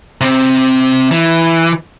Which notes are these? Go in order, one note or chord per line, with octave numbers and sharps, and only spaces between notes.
C3 C4
E3